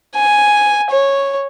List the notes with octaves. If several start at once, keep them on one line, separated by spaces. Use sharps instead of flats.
G#5
C#5